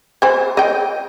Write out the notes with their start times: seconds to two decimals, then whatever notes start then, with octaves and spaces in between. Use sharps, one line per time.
0.22 C5 G#5
0.57 D#5 G5